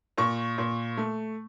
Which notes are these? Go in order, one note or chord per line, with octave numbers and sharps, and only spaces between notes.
A#2 C#6
A#2
A3